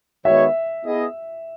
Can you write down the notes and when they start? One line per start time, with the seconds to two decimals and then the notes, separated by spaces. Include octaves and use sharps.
0.25 D#3 G#3 B3 F#4 C#5 E5
0.85 B3 E4 G#4 D#5